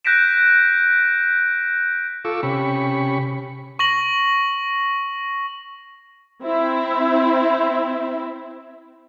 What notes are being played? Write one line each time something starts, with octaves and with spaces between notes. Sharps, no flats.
F#6 G6 A#6 B6 D7 E7
F4 A4 C#6 D6 E6
C3 C#4 G4 B5 C#6
C#6 A#6 F#7
C4 E4